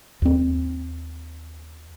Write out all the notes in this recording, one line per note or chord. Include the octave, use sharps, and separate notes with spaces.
D#2 C4